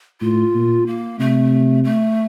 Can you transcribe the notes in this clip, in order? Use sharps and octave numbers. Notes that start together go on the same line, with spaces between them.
A2 F4
A#2
A#3
C3 A3
A3